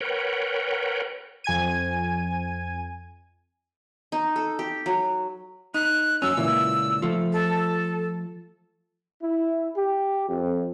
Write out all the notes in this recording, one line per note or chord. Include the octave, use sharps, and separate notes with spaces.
A#4 B4 C#5 F#5 G5
F2 G#5 G#6 D#7
D#4
A4
G4
F#3
D#4 F#6
F#2 F#3 C#4 E6
C#2 A#2 E3
F3 A3
A4
E4
G4
F2